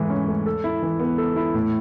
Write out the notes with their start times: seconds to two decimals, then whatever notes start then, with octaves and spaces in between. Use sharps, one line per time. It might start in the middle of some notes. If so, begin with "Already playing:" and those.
Already playing: G#2 E3 A3
0.10 C#4
0.28 A3
0.46 A4
0.64 E4
0.83 E3
1.00 B3
1.18 A4
1.36 E4
1.54 A2